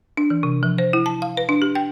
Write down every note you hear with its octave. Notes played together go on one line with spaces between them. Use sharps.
D4
E3
C3
F3
C5
E4
A5
F5
B4
D4
G4
G5